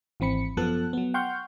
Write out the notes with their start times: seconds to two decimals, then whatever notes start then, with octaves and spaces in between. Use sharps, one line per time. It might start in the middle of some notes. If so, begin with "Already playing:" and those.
0.20 G#1 E3 C4 B5 C#7
0.57 F#2 F3 B3 A4 A5 F#6
0.93 F#3 B3
1.14 F#5 G5 C6 C#6 F6 G6